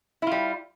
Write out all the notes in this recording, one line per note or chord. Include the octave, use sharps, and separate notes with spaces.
G3 E4 F4